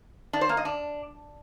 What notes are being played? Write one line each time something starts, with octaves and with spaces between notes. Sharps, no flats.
D4
C5
A#3
D#5
D4